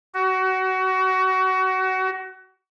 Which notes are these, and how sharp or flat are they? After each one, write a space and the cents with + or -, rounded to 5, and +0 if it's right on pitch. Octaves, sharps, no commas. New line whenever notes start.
F#4 +25